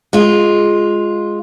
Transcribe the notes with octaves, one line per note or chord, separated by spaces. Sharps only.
G#3 F4